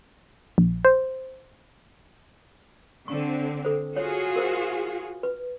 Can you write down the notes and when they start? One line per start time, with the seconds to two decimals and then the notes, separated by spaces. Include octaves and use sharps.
0.58 A#1
0.85 C5
3.08 D3 C4 C#6
3.65 A4 C5
3.96 F4 F#4 G#4 C#5
4.36 A#4 C5
5.23 B4